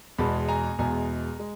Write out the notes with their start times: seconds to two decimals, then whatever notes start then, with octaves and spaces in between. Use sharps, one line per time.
0.18 E2 B2 G#3 A5 B5
0.49 G#5 A#5
0.79 E2 B2 G#3 G#5 A#5
1.40 G#3